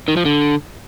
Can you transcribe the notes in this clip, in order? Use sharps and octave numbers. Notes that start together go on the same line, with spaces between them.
D#3
F3
D3